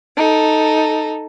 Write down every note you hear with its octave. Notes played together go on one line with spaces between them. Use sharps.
D#4 A4